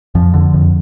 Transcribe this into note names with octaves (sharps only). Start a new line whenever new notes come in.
F2 F3
D3
F2